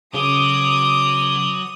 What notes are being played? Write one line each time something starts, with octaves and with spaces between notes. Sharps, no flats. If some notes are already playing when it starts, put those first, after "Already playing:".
C#3 F#3 F#4 D6 D#6